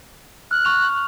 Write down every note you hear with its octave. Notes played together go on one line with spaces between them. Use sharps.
F6 F#6
C#6 F7